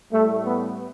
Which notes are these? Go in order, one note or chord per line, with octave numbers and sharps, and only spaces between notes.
A2 G3 A3
B3